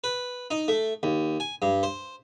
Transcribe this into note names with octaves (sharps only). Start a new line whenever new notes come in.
B4
D#4
A3
D#2
G#5
G2
C5